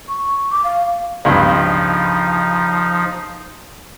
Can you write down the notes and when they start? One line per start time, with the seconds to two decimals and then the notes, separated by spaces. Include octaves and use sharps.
0.08 C#6
0.51 D6
0.64 F5
1.25 C#2 G2 B2 F3 D#4